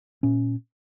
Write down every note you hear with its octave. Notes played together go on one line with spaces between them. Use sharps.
A#2 C#4